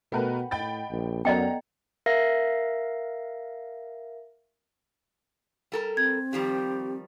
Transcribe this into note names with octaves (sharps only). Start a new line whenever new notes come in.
B2 A3 A#4 B4 F#5 G5 B5
A2 D#5 F#5 G5 B5 A6
A#1
F#2 B3 A4 D5 D#5 F#5 G5 A#5
A#4 E5 F5 A#6
G3 A4 A#4
C4 G#6
D#3 F3 G3 G4